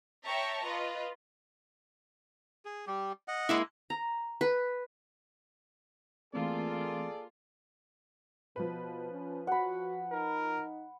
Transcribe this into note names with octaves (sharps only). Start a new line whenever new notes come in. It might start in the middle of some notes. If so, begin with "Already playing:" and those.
C#5 E5 G5 A5 A#5 C#6
F4 B4 D#5
G#4
G3 G4
D#5 F#5
G#3 A#3 E4
A#5
B4
E3 A3 A#3 C4 F4 G#4 A4 D5
B2 F3 B4
C#4
F#4 F#5 B5
D#4 A#4